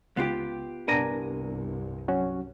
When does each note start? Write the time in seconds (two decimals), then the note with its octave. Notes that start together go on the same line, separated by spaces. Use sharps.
0.17 C#2 B3 F4 G4
0.88 C2 G2 B3 D4 A#4 G#5 A#5
2.08 F#3 C#4 F#4